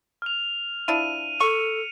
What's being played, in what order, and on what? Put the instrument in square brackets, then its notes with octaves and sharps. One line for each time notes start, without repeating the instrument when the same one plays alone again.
[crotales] F6 F7
[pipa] F3 D4 E4 [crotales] D#7
[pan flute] A4 [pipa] C#6 [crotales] C#7